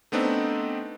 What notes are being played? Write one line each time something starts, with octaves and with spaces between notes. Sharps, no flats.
A3 B3 C4 D4 D#4